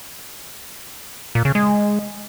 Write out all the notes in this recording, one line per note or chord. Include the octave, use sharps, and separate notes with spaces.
A#2
C#3
G#3